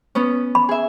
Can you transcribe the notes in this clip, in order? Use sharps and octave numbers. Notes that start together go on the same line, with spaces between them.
B3 C#4
B5
G#4 E5